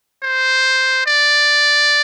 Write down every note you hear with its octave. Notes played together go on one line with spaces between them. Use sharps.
C5
D5